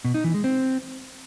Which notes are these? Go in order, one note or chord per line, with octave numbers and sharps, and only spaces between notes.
B2
D#4
E3
G#3
C4